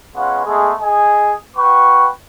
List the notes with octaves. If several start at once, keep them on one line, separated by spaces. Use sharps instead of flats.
G#3 B3 C#4 F4 F#5
G#3 A3 B3 G#4
G#4 D#5 G#5
F#4 B4 G5 C#6